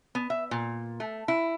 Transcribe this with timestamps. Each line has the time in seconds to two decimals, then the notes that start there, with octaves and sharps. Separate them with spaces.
0.15 B3
0.30 E5
0.51 A#2
1.00 A3
1.28 E4